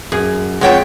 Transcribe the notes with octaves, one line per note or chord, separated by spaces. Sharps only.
F#2 G#4
F2 G#3 F4 C#5 E5 F#5 G5